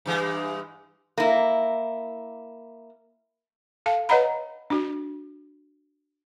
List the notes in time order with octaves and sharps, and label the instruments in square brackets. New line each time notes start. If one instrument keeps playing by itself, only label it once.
[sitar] G2 E3 G#3
[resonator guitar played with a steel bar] A#3 E4
[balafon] A4 F5 A5
B4 C#5 D#5 F#5 A#5 B5
D4 F#4